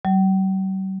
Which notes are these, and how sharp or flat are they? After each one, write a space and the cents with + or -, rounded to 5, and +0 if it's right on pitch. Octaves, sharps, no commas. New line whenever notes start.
G3 -45